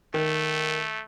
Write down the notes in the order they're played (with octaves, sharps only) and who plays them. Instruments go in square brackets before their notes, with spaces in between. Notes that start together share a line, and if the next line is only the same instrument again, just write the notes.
[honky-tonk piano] D#3 [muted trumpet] A3